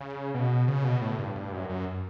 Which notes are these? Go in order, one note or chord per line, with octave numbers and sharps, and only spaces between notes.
C#3
B2
C#3
B2
A2
G2
G2
F#2
F#2